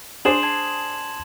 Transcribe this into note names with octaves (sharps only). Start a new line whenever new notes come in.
D4 G#4 C5 C6 E7 F#7
A5 G#6